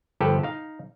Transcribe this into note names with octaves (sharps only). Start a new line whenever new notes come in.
G1 F3 G4 A4 B4 G5
D#4 F5